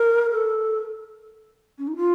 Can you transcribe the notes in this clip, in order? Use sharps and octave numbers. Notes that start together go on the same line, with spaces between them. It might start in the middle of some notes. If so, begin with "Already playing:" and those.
Already playing: A#4
A4
C#4
D#4
F4